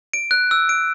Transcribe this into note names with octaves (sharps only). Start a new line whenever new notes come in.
D7
F#6
E6
D7